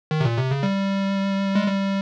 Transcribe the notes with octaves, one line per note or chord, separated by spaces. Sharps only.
D#3
C3
A#2
C3
C#3
G3
G#3
G3